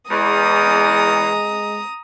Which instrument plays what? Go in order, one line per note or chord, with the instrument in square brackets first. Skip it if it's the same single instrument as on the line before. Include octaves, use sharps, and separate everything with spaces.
[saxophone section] E2 [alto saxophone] G#3 [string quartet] A#5 D#6